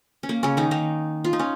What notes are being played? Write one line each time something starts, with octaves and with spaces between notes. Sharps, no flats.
C#4
A#3
C#3 C#4
D#3 D#4
D#3 D#4
F4
D#4
C#4